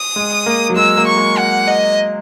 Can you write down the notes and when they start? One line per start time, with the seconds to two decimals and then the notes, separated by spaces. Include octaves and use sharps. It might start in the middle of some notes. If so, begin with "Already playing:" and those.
Already playing: D#6
0.16 G#3
0.46 A#3
0.70 F#3
0.76 G#3 E6
0.97 A#3
1.07 C#6
1.17 G#3
1.37 F#5
1.68 D#5